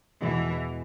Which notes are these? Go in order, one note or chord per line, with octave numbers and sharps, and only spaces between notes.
E2 B2 E3 G#3